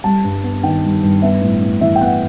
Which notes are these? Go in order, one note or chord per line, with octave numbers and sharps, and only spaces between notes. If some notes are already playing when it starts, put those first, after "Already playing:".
G3 A5
G2
B3
D#3 G5
G3
G2
B3 E5
A2
A2
E3 E5
G5
B3 F#5